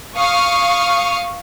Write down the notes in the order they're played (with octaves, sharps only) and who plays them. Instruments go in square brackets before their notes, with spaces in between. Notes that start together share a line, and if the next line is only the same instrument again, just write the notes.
[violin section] F5 C#6 D#6 F6